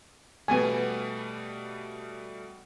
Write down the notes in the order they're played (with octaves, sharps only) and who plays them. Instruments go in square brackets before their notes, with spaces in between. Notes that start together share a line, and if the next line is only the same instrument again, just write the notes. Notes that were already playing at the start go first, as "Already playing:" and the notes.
[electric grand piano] B2 G3 A3 [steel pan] B3 G#5